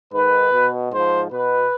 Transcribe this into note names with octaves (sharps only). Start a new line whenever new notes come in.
G#2 D#3 B4
B2
G#2 F3 C5
B2 B4